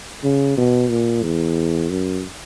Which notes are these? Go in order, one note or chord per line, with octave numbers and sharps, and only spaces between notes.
C#3
B2
A#2
E2
F#2